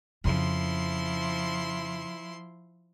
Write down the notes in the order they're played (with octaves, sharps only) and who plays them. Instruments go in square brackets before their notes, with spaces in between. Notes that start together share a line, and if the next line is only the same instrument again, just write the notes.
[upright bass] F2 C#3 [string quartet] F3 E4 C6